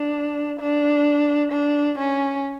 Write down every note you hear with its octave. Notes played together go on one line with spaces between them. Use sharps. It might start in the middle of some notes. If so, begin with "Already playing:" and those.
Already playing: D4
D4
D4
C#4